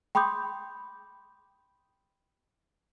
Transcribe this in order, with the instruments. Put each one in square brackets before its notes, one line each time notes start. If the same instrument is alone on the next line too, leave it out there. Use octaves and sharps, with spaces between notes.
[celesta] G5 B5 C6 D6 D#6 G6